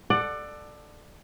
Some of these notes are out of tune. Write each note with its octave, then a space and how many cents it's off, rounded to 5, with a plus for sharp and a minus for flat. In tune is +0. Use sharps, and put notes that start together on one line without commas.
A4 +0 D5 +20 F#5 +5